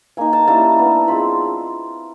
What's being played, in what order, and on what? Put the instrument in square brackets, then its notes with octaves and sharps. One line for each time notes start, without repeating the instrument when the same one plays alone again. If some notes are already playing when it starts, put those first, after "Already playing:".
[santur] A#3 D#4 G#5
A5
G3 A#3 C#4 E4 A5
G3 B3 D4
G#3 C4 F4 B5